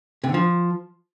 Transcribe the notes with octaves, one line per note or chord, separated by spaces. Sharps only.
C3
D3
F3